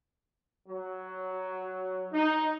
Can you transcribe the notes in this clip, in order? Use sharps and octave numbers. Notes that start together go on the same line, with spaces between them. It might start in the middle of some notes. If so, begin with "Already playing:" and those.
F#3
D#4